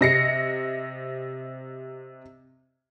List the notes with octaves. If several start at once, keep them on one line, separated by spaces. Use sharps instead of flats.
C3 D#5 A#6 C7 C#7